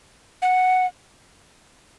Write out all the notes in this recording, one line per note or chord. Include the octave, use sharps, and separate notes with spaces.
F#5